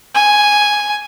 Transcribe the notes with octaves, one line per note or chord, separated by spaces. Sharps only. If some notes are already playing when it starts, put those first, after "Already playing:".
G#5